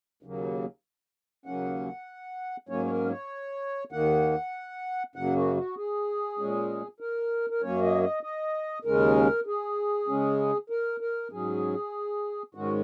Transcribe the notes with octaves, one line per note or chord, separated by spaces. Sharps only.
D#2 C#3 F#3 A#3
D#2 C#3 F#3 A#3 C#4 F#5
G#2 F#3 A#3 C#4 C#5
C#5
A#4
C#5
D#2 D#3 A#3 F#5
F#2 C#3 F#3 A#3 F#5
F#4
F#4
G#4
A#2 G#3 C#4
A#4
A#4
F#2 F#3 A#3 C#4 C#5
D#5
D#5
D#5
D#2 C#3 G#3 C#4 A#4
G#4
C#3 G#3 C#4
A#4
A#4
G#2 F#3 C#4 G#4
G#2 D#3 G#3 C#4 F#4